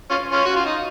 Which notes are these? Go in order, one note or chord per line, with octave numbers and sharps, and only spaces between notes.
C#4 F4
C#4 F4
F#4
F4
D#4